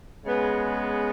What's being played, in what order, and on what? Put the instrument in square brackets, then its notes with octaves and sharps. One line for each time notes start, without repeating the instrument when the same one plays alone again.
[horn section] C#3 G#3 B3